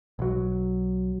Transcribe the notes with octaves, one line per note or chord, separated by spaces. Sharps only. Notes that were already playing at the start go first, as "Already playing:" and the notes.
B1 F#3